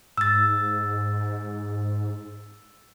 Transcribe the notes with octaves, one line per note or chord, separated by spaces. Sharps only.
G#2 E6 A6